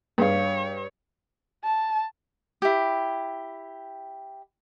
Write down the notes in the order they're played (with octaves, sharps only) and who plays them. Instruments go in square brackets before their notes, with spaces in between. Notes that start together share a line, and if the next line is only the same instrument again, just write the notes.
[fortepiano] G2 [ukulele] G#4 F5 [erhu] C#5
[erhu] A5
[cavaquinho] E4 G4